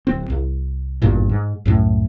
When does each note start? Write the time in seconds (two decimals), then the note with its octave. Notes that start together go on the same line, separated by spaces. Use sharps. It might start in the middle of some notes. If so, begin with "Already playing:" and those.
0.07 D1 C4
0.30 C2
1.02 G#1 E2 G2 A#2
1.29 G#2
1.65 C2 F#2 A2